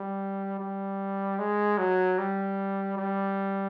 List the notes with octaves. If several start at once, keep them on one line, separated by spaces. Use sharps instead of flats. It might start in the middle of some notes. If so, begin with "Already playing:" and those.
Already playing: G3
G3
G#3
F#3
G3
G3